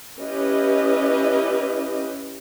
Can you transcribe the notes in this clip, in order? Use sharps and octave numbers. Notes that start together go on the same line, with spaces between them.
C#4 E4 G4 B4 D#5